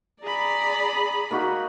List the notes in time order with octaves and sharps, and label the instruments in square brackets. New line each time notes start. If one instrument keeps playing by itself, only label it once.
[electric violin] G#4 B5 [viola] D5 A#5
[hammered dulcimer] A#3 D#4 F#4